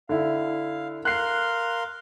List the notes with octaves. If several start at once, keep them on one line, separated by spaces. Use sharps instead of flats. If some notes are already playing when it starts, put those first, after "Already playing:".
D3 E4 F5
A#4 F5 C6 F#6 C7